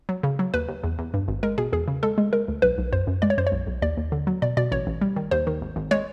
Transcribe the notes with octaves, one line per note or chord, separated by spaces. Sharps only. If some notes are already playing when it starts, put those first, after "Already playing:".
F#3
C#3
F#3
D#2 B4
D#2
E2
E2
G2
G#1
G#3 A#4
B2 G#4
E2 G#4
C#3
G#3 A4
G#3
G#3 A#4
D2
B1 B4
B1
F#2 C5
F#2
G#3 D5
C#5
F#2 C5
C#5
B1
B1
D#2 D5
D#2
D3
F#3
B2 D5
B2 D5
A1 C#5
A1
G3
D#3
D#2 C5
D#3
G#1
G#1
G#3 C#5